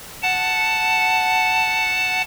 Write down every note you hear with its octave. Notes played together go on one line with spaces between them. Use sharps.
F#5 A5